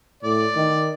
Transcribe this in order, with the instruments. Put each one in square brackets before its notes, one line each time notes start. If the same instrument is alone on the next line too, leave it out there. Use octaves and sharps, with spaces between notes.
[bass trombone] A2 [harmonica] D5
[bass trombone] D#3